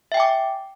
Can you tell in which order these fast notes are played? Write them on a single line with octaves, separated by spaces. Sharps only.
E5 G5 G#5 D6